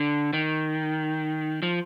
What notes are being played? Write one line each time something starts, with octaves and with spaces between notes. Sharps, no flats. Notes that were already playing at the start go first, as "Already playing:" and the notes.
Already playing: D3
D#3
F3